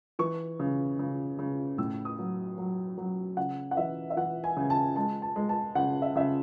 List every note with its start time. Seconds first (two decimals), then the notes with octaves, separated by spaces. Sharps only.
0.19 E3 C#6
0.60 C#3
0.99 C#3
1.39 C#3
1.78 A2 E6
2.05 D#6
2.19 F#3
2.58 F#3
2.98 F#3
3.37 C#3 F#5
3.71 F#5
3.77 E3 E5
4.10 E5
4.17 E3 F#5
4.44 G#5
4.57 C#3
4.70 A5
4.96 G#3 A5
5.22 A5
5.36 G#3
5.49 A5
5.75 C#3 F#5
6.02 E5
6.16 C#3 E5